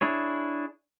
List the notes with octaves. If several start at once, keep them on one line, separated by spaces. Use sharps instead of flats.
D4 E4 G#4 C#5